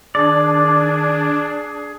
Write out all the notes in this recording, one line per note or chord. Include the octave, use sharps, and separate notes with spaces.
D#3 D4 G#4 D5